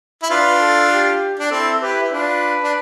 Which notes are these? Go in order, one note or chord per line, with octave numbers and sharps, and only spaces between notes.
E4
D4 F4 B4
A4
G4
D4
C4 E4 A4
E4 G4 B4
E4
D4 F4 B4
D4